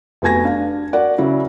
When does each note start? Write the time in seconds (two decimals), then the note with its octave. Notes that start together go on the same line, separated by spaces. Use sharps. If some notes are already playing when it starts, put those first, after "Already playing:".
0.22 F1 B3 F#4 G#5 G#6 A#6
0.44 D4 F5
0.93 F#4 A#4 D5 F#5
1.18 C#3 F#3 C#4 E4